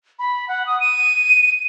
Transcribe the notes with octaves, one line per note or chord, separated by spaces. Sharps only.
B5
F#5
D#6
D#7